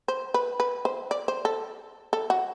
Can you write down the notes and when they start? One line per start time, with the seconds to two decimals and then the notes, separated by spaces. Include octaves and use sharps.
0.08 C5
0.34 B4
0.60 B4
0.85 C5
1.11 D5
1.28 C5
1.45 A4
2.13 A4
2.30 F#4